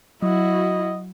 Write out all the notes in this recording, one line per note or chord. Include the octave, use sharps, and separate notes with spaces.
F#3 E4 F#4 D#5